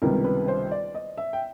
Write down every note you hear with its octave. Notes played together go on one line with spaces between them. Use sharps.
C#2 C3 D#3 G3 B3 A#4
B4
C5
D5
D#5
E5
G5